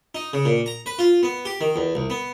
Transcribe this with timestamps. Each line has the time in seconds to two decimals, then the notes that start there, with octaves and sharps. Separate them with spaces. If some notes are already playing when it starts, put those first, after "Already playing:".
0.15 D#4
0.33 C#3
0.45 A#2
0.66 A#5
0.86 B4
0.99 F4
1.23 B3
1.45 G4
1.61 D#3
1.76 E2
1.95 C2
2.10 B3